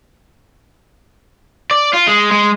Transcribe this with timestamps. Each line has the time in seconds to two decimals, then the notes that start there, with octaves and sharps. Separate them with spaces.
1.71 D5
1.94 F4
2.08 G#3
2.32 G#3